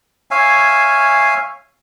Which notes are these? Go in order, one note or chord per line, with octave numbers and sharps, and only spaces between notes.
C#5 E5 F5 G#5